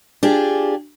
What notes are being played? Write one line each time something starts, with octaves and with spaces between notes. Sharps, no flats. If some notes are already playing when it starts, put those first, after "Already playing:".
D4 F4 G4 G#4